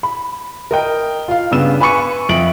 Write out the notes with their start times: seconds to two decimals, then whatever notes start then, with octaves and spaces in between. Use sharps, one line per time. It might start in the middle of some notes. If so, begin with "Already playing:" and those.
0.03 B5
0.71 A#4 D#5 G5
1.28 F4 F5
1.51 G2 C#3 B3 E6 E7
1.80 B4 G#5 B5 C#6 C#7 D#7
2.29 F2 E5 D7 F#7